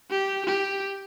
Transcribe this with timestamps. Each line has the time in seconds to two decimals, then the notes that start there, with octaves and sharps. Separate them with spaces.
0.11 G4
0.46 G4